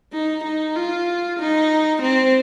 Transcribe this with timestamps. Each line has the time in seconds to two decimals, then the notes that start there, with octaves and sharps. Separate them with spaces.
0.13 D#4
0.44 D#4
0.76 F4
1.40 D#4
2.02 C4